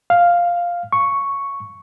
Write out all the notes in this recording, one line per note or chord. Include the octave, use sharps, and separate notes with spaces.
F5
C#6